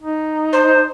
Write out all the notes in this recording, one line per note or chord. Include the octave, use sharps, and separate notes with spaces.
D#4
C5